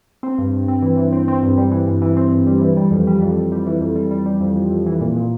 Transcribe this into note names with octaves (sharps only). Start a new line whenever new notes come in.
C4
G2
G2
C4
E3
E3
C4
C4
G2
G3
E3
G2
E3
C4
G2
G3
E3
G3
F2
G3
F2
F2
G3
E3
F2
G3
G3
G3
F2
F2
F2
E3
A#2
A#2